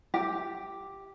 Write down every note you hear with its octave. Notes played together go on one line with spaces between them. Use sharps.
G4